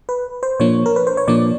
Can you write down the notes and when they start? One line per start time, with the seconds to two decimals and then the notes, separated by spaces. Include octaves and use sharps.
0.09 B4
0.43 C5
0.60 A#2 F3 A#3 D4 C#5
0.86 A#4
0.96 B4
1.07 C5
1.17 C#5
1.28 A#2 F3 A#3 D4 D5